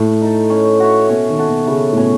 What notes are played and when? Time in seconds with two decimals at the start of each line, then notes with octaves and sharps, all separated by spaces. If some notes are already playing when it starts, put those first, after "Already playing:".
Already playing: A2 A3
0.22 D#4 A4
0.50 C#4
0.80 F#4 C#5 E5
1.09 B2 C#4
1.29 D#3
1.39 F#4 A4
1.48 B2
1.67 C#3 A3
1.92 A2
1.97 B2 C#4 G#4